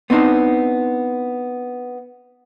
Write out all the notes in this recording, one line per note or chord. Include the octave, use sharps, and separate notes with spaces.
B3 C4 D4 D#4